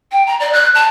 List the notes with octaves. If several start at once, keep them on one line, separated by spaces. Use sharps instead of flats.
G5
A#5
D5
F#6
A5